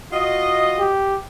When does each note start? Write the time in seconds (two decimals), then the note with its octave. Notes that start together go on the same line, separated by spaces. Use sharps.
0.12 F4 F#4 D#5
0.79 G4